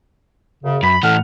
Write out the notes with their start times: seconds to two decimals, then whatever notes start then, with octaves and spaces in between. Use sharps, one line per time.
0.64 F#2 C#3
0.83 F#2 B5
1.03 A2 E3 A4 F#5 F6